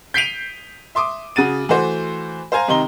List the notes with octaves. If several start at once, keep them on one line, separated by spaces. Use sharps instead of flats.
G6 B6 C7 D7 D#7 F7
E5 C6 D6 D#6
C#3 F#4 A6 D#7
E3 A3 F#4 C5
C5 F5 G#5 A#5
C3 D#3 D#4 A#5 C6 G7